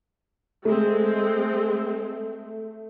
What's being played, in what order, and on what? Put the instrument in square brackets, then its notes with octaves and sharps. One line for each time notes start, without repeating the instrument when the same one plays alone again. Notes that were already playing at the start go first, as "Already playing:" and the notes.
[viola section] G#3 C4 [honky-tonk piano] A3